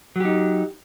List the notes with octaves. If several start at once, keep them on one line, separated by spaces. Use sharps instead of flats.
F#3 D#4 G4